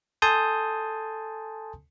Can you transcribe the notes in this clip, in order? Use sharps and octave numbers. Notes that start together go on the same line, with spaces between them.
A4 G#5 A5 C6 D#6 G6